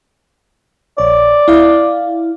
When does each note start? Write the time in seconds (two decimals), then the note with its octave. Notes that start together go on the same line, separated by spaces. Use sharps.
0.98 A#1 C#5 D5
1.48 E4 F5